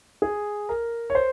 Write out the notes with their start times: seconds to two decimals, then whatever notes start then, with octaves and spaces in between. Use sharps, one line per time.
0.22 G#4
0.69 A#4
1.10 C#5
1.15 C5